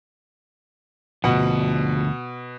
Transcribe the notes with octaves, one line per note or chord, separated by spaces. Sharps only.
D2 B2 F3 F#5